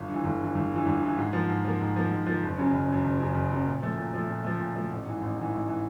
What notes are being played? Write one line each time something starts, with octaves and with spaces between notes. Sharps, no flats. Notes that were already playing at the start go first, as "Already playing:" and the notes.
Already playing: G1
G2 E3
G1
G2 E3
G1
G2 E3
G1
G2 E3
G#2
F3 A#3
G#2
F3 A#3
G#2
F3 A#3
G#2
F3 A#3
F#1
F#2 C#3
F#1
F#2 C#3
F#1
F#2 C#3
F#1
F#2 C#3
A#2
F3 A3
A#2
F3 A3
A#2
F3 A3
A#2
F3 A3
A1
G#2 E3
A1
G#2 E3
A1
E3